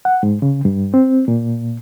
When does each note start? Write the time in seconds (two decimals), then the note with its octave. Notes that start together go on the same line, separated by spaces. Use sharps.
0.05 F#5
0.23 G#2
0.42 C#3
0.65 G2
0.94 C4
1.28 A#2